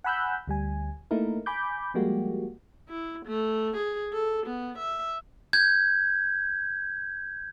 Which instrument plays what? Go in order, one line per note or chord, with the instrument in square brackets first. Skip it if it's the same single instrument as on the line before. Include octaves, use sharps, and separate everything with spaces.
[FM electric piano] F#5 G#5 B5 E6 F#6 G6
D2 G3 G#5
A3 A#3 D#4 E4 A#4
G#5 B5 D6 G6
F3 G3 G#3 A#3 F#4 G4
[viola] E4
A3
G#4
A4
B3
E5
[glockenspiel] G6 G#6